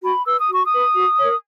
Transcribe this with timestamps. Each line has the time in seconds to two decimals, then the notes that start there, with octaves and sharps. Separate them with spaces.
0.02 F#4 B5
0.25 B4 E6
0.39 D#6
0.49 F#4 C#6
0.65 D#6
0.72 B4
0.95 F#4
1.18 A#4 C#5